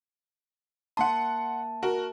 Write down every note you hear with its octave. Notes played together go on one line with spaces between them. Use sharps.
A#3 F#5 A5 C6
F#4 A#4